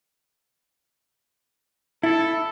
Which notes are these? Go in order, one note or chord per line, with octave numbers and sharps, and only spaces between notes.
E4 A4